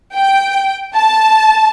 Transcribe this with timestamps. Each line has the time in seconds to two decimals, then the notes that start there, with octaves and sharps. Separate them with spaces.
0.14 G5
0.95 A5